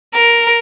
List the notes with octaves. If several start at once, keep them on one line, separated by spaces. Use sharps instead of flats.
A#4